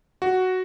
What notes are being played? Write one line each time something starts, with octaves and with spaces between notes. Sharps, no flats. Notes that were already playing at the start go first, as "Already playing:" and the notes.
F#4